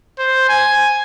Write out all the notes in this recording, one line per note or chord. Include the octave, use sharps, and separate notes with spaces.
C5
G#5